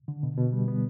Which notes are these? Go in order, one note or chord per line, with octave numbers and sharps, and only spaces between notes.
D3
B2
B2
G3
B3